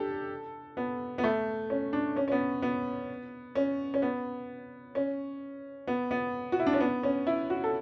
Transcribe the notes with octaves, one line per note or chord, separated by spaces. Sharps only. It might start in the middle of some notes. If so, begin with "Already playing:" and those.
Already playing: D4 G4 A4
B3
B3
A3
C#4
D4
C#4
C#4
B3
B3
C#4
C#4
B3
C#4
B3
B3
F#4
E4
D4
C#4
B3
C#4
E4
F#4
A4